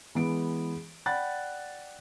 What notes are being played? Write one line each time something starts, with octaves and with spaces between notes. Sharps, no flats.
E3 G#3 B3 D7
D5 F#5 G5 B5 F#6 A6